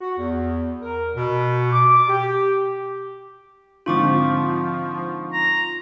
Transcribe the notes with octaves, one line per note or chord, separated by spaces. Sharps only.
F#4
E2
A#4
B2
D6
G4
G#2 D3 F3 C4 F4 C#6 D6
A#5